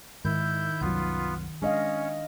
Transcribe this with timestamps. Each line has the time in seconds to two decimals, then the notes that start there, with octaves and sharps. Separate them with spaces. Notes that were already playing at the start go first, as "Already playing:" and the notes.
0.25 G#2 D#3 E4 G6
0.81 C2 F#2 F#3 B3 F4
1.62 G#3 C#4 D4 D#5 F5